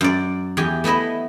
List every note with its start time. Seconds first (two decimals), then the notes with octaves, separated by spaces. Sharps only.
0.01 F#2 D5
0.57 E2 G4 G#5
0.84 A3 B3 E4 D#5 E5